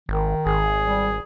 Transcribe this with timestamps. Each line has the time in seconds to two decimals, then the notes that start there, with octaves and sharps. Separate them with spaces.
0.09 G#1 D#3
0.46 G#1 G#4
0.82 G3